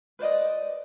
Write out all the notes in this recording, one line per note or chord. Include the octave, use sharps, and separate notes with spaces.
B4 C5 D5 D#5